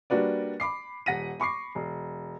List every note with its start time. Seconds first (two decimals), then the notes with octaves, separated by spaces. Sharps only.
0.10 G3 A#3 D4 F#4 B4 D5
0.60 B5 D6 C7
1.06 D#1 F#5 A#6 B6 D#7
1.40 B5 C#6 D6 C7
1.75 E1